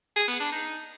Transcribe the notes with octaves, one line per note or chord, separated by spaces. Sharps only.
G#4
B3
D4
D#4